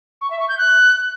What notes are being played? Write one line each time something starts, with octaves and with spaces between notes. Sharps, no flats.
C#6
E5
C#6
G6
F#6